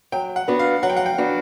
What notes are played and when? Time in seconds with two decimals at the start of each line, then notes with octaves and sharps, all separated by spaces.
0.12 F#3 G5
0.36 F#5
0.48 B3 D4 F#4
0.59 F5
0.83 F#3 F#5
0.90 G5
0.97 F#5
1.06 G5
1.18 B3 D4 F#4